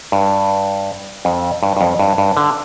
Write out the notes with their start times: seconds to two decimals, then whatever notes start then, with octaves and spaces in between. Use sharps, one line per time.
0.12 G2
1.25 F2
1.63 G2
1.77 G2
1.81 F2
1.99 G2
2.18 G2
2.37 D3